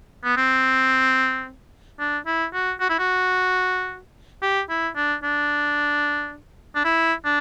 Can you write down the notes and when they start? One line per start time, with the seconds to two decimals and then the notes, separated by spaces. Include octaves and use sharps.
0.24 B3
0.37 C4
1.99 D4
2.26 E4
2.54 F#4
2.80 F#4
2.89 E4
2.99 F#4
4.42 G4
4.69 E4
4.96 D4
5.23 D4
6.75 D4
6.85 E4
7.25 D4